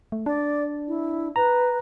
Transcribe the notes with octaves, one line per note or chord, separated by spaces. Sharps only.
A3
D4 D5
E4
B4 A#5